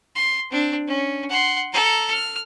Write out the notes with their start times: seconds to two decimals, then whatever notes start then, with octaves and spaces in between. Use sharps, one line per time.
0.15 C6
0.51 C4 D4
0.88 C#4
1.29 F#5 C6
1.73 A4 A#5
2.10 F6